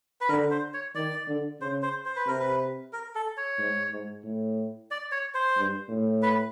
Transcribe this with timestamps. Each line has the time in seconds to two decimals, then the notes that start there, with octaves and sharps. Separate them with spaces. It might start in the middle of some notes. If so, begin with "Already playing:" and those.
0.21 B4
0.29 D3 A#4
0.51 C5
0.74 C#5
0.95 D#3 D5
1.28 D3
1.60 C#3 C5
1.82 C5
2.05 C5
2.16 B4
2.26 C3 A#4
2.40 B4
2.93 A#4
3.15 A4
3.37 C#5
3.59 G#2
3.91 G#2
4.24 A2
4.91 D5
5.12 C#5
5.34 C5
5.56 G2
5.89 A2
6.22 B4